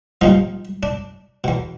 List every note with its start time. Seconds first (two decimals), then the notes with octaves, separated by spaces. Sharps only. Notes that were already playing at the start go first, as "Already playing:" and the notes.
0.21 C2 A#2 F3 D#4
0.83 D4
1.44 E2 B2